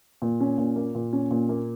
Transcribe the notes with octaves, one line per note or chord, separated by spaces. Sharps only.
A#2
C#4
A#2
A#3
A#2
C#4
A#2
A#3